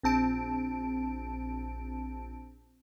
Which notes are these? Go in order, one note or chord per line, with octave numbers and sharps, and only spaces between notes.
A#1 C4 A5 D7